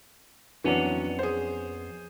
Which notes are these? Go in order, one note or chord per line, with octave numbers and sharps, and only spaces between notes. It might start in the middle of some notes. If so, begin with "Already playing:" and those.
F2 E3 F#3 B3 C#4 D4
G#4 C5